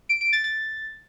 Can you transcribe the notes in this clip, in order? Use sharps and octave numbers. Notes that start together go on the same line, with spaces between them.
D7
D7
A6
A6